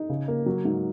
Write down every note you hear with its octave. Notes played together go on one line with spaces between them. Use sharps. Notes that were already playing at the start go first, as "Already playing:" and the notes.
Already playing: D#4
C#3
A#3
F#3
G#2